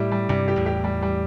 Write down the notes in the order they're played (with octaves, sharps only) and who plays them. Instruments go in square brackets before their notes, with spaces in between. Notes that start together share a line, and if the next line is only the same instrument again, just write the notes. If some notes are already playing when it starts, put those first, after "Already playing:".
Already playing: [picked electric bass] A2 [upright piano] G3 E4 G4
[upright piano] G3
[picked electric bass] G2 C3 [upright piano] G3
[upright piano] G4
[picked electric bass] E2 A2
[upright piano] G4
G3
G3